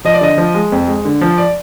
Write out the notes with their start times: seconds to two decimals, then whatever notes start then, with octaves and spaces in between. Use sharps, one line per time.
0.05 F3 D#5
0.14 D5
0.21 D3 D#5
0.37 F3
0.54 G#3
0.72 F2
0.87 G#3
1.05 D3
1.21 F3
1.38 D5